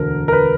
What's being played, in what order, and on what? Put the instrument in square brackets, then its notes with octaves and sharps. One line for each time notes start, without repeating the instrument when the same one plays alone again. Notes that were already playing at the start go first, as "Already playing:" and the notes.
Already playing: [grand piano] E1 D2 D3 A#4
A#4
B4